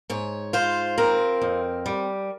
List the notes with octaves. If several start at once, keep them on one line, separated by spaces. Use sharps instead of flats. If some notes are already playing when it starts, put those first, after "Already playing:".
G#2 C#5
F4 C5
C4 A#4
F2
G3